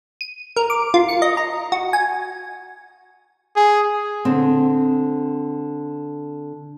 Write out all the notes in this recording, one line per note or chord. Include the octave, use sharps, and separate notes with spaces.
D#7
A#4
D6
F4
C#7
D#5
A#5
F#4
G#5
G#4
D3 C4